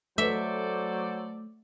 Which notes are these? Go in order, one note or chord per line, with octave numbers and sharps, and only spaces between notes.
F#3 A3 A4 C5 D5 E5